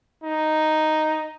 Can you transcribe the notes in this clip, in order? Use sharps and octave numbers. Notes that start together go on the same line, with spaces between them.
D#4